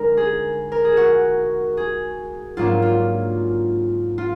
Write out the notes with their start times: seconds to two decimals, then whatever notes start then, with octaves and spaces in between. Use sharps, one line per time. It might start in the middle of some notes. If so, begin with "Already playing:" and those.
Already playing: D3 G#3 D#4 A#4
0.17 G#4
0.72 A#4
0.85 G#4
0.97 F#4
1.77 G#4
2.57 G#2 F#3 A#3 D4 F4
2.82 F4
4.18 F4